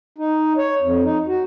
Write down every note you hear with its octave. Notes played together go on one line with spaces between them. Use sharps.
D#4
C#5
F2
D#4
F#4